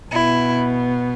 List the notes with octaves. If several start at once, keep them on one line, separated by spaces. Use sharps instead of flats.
B2 B3 E4